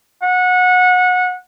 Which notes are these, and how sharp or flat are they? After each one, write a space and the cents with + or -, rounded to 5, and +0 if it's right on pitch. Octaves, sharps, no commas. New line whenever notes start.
F#5 -25